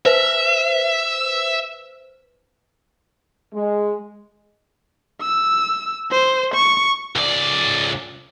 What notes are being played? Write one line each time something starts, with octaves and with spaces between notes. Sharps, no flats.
B4 C5 E5
G#3
E6
C5
C#6
C#2 D5